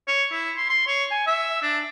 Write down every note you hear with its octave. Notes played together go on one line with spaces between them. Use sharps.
C#5
E4
C6
C6
C#5
G#5
E5
D4